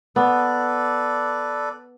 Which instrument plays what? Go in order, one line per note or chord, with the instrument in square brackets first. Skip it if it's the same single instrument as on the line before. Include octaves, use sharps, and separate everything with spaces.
[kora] B3 [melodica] A4 B4 D5